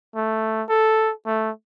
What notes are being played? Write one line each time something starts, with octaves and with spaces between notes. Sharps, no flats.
A3
A4
A3